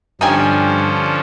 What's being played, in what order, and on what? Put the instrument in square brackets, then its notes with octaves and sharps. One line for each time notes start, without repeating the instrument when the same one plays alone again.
[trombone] G2 [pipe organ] D3 F3 C#4 [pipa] D#4 G5 G#5